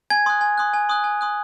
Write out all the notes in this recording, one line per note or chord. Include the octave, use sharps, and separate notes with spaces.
G#5 G#6
C6 D#6 F#6
G#5
C6 D#6 F#6
G#5
C6 D#6 F#6
G#5
C6 D#6 F#6